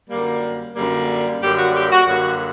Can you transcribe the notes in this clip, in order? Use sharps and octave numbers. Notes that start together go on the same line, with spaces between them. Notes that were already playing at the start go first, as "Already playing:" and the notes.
F#2 D3 G3 A#3
F#2 D3 G3 A#3
F#2 D3 G3 A#3 G4
F#4
G4
F#4
F#2 D3 G3 A#3 F#4